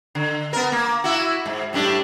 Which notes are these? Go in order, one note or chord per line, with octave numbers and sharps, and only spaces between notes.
D3
B3 A#4
A#3
E4 F#4
G#2
A2 G3 D4